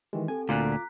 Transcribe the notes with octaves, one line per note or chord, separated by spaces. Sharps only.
D#3 E3 G#3 G4
C4 A4 G#5
D2 A#2 F4 A#5 D6 F#6
B6